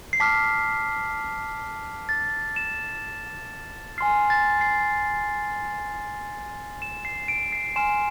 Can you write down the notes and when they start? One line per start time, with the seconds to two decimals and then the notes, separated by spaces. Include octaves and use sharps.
0.13 C7
0.20 A5 D6 F6 B6
2.09 A6
2.56 E7
3.98 G#5 C6 F6 C7
4.30 A6
4.61 C7
6.82 E7
7.05 C7
7.28 D7
7.52 C7
7.76 G#5 C6 F6 E7